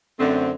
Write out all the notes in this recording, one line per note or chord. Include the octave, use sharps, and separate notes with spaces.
F#2 D3 A3 C4